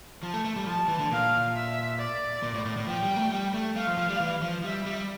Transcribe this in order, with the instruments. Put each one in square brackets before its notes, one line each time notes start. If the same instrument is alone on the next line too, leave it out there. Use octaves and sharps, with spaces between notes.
[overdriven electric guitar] F3 [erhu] A5
[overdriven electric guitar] A3
A3
G3
[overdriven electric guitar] F3 [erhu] A5
[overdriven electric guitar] E3
D3
[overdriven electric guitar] A#2 [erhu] F5
[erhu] E5
D5
[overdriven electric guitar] A#2
A2
A2
A2
[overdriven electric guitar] F3 [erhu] G5
[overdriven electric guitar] G3
A3
G3
A3
[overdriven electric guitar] A3 [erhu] F5
[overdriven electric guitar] F3
F3
G3
E3
F3
[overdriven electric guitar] G3 [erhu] E5
[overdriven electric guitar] G3